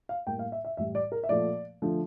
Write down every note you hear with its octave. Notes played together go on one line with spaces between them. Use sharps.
F5
A2 G3 A#3 G5
F5
E5
E5
A2 E3 G3 E5
D5
A#4
E5
A#2 F3 A3 D5
D3 F3 A3